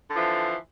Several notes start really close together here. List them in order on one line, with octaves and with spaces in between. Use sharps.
D3 F3 E3